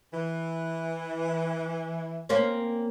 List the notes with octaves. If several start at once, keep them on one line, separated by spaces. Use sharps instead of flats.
E3
A#3 C4 C#4